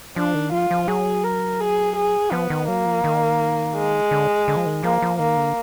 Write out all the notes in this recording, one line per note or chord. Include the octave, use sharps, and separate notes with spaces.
F3 D4
D#3
F3 F4
F3
F#3 G#4
A#4
G#4
G#4
F3 B3
D#3
F#3 A#3
F3
D#3
G#3
D3
D3
F3
D#3
F3 A#3
F3
D#3 A#3
D3